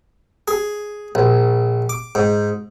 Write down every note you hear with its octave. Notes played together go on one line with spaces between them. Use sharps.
G#4
A#1
D6
G#2